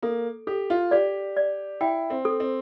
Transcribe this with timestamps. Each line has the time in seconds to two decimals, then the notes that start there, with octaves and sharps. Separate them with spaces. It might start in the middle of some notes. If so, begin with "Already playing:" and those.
0.03 A#3 A4
0.47 G4 A4
0.70 F4
0.91 G4 D5
1.36 D5
1.81 E4 G5
2.10 C4
2.25 A4
2.40 C4